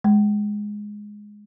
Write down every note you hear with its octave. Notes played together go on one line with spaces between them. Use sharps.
G#3